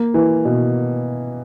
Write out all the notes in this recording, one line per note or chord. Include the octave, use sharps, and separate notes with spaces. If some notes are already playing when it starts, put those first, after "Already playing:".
Already playing: A#3
E3
B2